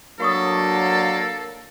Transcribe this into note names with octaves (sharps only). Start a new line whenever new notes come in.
F#3 A#3 D4 F#4 A4 C#6 D#6